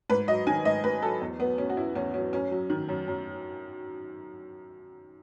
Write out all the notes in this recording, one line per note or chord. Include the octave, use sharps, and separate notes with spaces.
G#2 B4
F#3 D#5
D#3 G#5
G#2 D#5
G#2 B4
F#3 A4
E2
F#3 B3
B2 C#4
F#4
E2 E4
E2 C#4
F#3 C#4
F#2 C#4
F#3
D#3
F#2
F#2